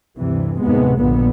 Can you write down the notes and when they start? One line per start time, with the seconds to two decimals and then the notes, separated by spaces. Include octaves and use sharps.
0.17 D2 G2 C3 E3
0.61 D#2 A2 C3 G#3 B3
1.00 A#1 G2 A#2 D3 B3